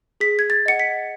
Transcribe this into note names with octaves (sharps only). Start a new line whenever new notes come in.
G#4 B6
G#6
A6
D#5 F#5 C#7
B6